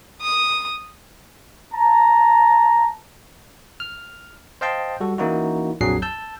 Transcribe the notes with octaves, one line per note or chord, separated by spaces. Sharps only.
D#6
A5 A#5
F6
C5 D#5 F5 G5 A5 C6
G3 F#4 A4
E3 A#3 C#4 D#4 E4 F#4
A#1 F2 F#3 D4 G#4 C7
A5 E6 G6